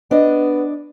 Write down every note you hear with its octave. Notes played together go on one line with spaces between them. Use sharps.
B3 D4 D#5